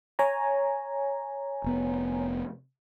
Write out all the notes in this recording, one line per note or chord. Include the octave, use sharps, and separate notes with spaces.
C#5 G#5 A#5
F1 B3